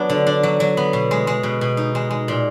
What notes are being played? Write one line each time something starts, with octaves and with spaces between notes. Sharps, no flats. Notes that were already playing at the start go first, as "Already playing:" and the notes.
Already playing: F#3 B3 D4
D3
D4
F#3
F#3
B3
B2
G#3
G#3
B2
B2
D#4
G#3
G#3
A#2